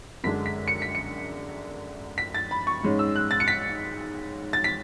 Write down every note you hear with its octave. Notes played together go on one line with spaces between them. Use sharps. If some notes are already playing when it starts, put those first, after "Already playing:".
F#2 D3 G#3 D4 B6
B6
C#7
B6
C#7
B6
A6
B5
C#6
G#2 G#3 C#4
E6
F#6
A6
C#7
B6
A6
B6